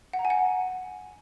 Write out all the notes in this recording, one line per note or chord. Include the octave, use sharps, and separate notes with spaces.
F#5
A#5
G#5
F#5